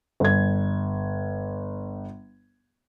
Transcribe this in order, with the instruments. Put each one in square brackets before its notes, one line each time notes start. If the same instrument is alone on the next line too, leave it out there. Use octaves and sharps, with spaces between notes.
[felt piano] G1 G#6